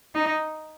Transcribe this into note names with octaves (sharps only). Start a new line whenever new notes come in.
D#4